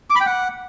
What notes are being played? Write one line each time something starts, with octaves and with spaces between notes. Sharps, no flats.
D6
B5
G5
F#5